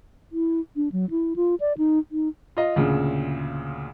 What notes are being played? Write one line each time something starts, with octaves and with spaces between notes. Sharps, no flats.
E4
D4
F#3
E4
F4
D5
D#4
D#4
F4 D#5
D2 A#2 C#3